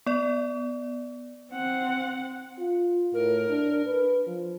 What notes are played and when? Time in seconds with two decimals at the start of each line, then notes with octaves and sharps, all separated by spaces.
0.06 B3 D5
1.53 C4 F#5
2.59 F4
3.14 A2 A#4
3.50 D4
3.86 B4
4.27 F3